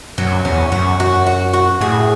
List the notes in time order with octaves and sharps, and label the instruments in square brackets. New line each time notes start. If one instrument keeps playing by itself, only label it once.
[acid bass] F#2 [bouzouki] F#3
[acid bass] E2 [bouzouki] C#4
[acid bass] F#2 [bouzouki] F#4
[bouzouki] F#4
F#4
F#4
[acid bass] A2 [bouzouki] G#4